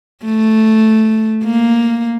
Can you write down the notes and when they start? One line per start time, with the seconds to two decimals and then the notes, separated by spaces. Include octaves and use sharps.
0.25 A3
1.45 A#3